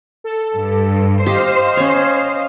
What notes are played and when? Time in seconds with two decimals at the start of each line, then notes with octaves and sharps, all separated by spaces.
0.24 A4
0.55 G2
1.26 G4 C5 D#5 F5
1.77 C#4 C#5